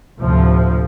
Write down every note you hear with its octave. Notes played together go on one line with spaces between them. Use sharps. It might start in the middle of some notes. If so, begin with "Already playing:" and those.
D2 A2 C3 F3